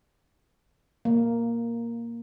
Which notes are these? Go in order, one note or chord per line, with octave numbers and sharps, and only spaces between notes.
A#3